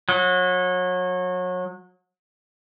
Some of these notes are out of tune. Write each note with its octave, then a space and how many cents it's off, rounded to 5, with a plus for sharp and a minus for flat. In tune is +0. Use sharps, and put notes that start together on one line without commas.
F#3 -30